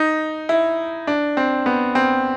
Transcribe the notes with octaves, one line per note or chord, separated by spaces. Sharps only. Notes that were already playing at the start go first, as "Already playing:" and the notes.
Already playing: D#4
E4
D4
C4
B3
C4